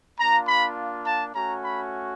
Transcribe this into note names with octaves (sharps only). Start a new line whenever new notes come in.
A#3 D4 F4 A#5
B5
A5
A3 C#4 F#4 A#5
B5